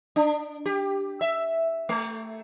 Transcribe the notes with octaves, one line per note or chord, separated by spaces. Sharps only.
D4
G4
E5
A3